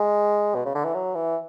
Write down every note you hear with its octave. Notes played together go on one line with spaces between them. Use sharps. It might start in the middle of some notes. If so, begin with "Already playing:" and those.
Already playing: G#3
B2
C#3
D3
E3
F#3
E3